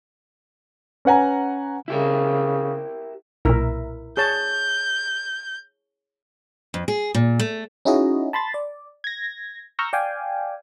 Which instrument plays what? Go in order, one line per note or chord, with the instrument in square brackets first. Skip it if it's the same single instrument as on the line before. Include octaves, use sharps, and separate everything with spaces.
[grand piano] C#4 B4 F#5 G#5 A#5
[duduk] C#3 [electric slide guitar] E4 G4 A#4
[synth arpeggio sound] B1 A#2 [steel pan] E4 A#4 E5
[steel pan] G#4 C#5 A5 [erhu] G6
[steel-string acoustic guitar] F2
G#4
A#2
A3
[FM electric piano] C#4 D#4 E4 F#4 G#4 D#5
A5 B5 C6 A6
D5
G#6 A#6
A#5 C#6 E6 F6 G6 A#6
D5 F5 G5 G#5